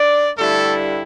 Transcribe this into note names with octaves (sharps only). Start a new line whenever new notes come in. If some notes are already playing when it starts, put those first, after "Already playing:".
Already playing: D4 D5
G2 D3 G3 A3 E4 A4